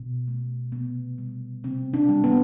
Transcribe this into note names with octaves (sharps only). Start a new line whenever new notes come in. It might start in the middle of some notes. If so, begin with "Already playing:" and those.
Already playing: B2
A3
C3 B3
G3
C3 C4
D4
G3
B3